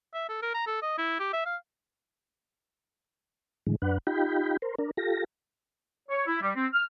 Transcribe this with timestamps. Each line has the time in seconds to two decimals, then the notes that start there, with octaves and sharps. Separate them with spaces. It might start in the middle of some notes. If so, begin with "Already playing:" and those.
0.14 E5
0.29 A4
0.42 A#4
0.54 A#5
0.67 A4
0.82 D#5
0.98 E4
1.19 G4
1.33 E5
1.46 F5
3.67 A2 D3 E3 G#3
3.82 F#2 D4 B4 F#5
4.07 D#4 F4 G4 G5 B5
4.62 A#4 C5
4.79 D4 A#4
4.97 F4 G4 A4 A#6
6.09 C#5
6.26 E4
6.41 G3
6.56 C4
6.73 F6